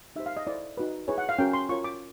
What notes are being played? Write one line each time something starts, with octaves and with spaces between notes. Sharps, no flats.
D#4 G4 C5 E5
F5
D#5
E4 A4 C5 D5
D#4 F#4 B4
E4 G#4 B4 C#5
F#5
F5
C#4 F#4 A#4 G5
C6
F4 A#4 C#5 C#6
D6